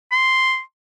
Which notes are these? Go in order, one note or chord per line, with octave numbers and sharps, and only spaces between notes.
C6